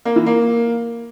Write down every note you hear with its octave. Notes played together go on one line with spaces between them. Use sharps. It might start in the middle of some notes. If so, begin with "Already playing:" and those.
A#3
E3
A#3